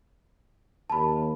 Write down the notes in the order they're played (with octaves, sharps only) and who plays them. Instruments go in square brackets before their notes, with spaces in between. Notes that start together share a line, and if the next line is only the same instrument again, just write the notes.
[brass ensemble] D#2 [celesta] A5 B5